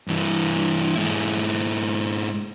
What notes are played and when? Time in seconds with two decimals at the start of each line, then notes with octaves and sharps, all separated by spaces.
0.08 G2 E3
0.95 G#2 E4